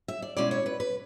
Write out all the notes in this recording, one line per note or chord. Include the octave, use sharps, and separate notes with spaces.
E5
D5
B2 G#3 C#4 E4 D5
C#5
B4
B4